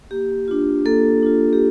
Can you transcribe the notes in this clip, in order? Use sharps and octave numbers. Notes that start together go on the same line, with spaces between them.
A#3 G4
D4 F4
A#3 A4
D4 F4
G4